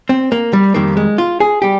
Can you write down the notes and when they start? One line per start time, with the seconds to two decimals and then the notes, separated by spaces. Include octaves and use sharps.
0.09 C4
0.32 A#3
0.53 G3
0.74 F2 D#3 G3 A#3
0.97 G#3
1.18 F4
1.40 G#4
1.62 G3 G4